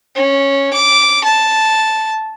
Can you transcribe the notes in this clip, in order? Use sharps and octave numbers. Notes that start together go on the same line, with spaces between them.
C#4
D6
A5